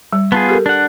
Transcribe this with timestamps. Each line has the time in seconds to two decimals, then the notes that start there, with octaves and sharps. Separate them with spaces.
0.13 G3
0.32 B3 F4 G#4 A5
0.49 G4 A4 A#4
0.66 D4 F#5